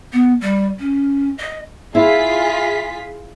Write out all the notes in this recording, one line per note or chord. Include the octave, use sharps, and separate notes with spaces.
B3
G3
C#4
D#5
E4 F4 G#4 B6